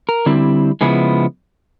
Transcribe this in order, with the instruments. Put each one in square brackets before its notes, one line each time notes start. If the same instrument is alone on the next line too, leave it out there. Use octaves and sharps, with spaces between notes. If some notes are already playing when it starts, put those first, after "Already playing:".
[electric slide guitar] A#4
D3 G3 C4 E4
C#3 F3 G#3 B3 E4 G#4